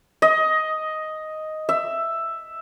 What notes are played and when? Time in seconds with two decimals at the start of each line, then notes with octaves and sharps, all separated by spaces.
0.22 D#5
1.69 E5